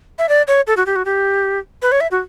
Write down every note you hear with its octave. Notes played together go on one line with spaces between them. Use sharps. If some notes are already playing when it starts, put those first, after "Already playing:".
E5
D5
C#5
A4
F#4
G4
F#4
G4
B4
C#5
E5
F#4